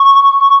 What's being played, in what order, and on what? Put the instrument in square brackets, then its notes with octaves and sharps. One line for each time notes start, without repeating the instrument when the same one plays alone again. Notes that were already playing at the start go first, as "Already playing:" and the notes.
Already playing: [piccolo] C#6